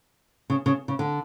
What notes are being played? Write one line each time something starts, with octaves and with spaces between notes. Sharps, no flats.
C#3
C#3
C#3
D3